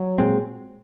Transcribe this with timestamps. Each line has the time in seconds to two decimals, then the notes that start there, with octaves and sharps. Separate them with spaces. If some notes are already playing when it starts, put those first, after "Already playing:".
Already playing: F#3
0.18 A#2 G#3 C4